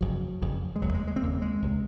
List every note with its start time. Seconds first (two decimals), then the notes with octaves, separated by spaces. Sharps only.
0.01 F1 F2 C#3 F#3
0.42 F1 F2 C#3
0.76 G#3
0.81 F1 D#2 C#3 F#3
0.94 G#3
1.08 G#3
1.16 C4
1.21 F1 D#2 C#3 A#3
1.42 G#3
1.62 C#2 C3